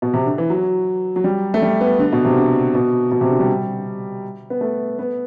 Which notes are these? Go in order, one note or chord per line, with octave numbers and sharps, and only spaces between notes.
B2
C3
D3
E3
F#3
F#3
G3
A3
G3
B3
D3
B2
C3
D3
B2
B2
C3
D3
G3
B3
A3
B3